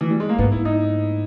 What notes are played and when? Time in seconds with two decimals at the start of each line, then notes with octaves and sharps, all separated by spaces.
0.01 E3
0.10 G3
0.20 G#3
0.29 A#3
0.38 G#2 B3
0.52 E4
0.65 D#4